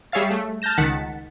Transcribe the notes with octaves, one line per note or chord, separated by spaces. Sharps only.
G3 G#4 C#5 E5 F5 A6
A3
A5 F6 G6 A#6 E7
C#2 D#3 F#5 A6 B6 C#7